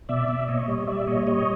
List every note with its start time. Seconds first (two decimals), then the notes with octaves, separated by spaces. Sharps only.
0.09 B2 D5 E5
0.28 B2
0.48 A#2 C#5 D#5
0.68 G3
0.87 G3 D5 E5
1.07 A#2 C#5 D#5
1.27 G3 C#5 D#5